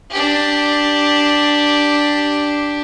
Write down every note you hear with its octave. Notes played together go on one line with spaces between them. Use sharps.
D4 G4